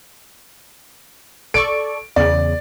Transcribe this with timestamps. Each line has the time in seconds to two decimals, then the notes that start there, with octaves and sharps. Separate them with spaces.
1.54 A4 D5 C#6 D7
2.16 E2 C#3 D5